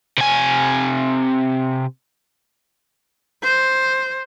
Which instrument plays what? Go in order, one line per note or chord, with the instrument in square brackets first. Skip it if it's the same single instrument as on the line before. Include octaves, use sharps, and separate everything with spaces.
[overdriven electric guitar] C3 G#5
[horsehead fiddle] C5